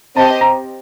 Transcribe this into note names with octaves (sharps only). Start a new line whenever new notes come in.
C4 G4 C5 D#5 A5
A#5